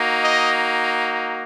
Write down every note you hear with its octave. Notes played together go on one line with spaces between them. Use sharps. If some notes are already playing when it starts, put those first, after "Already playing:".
Already playing: A#3 D#4 F#4
D#5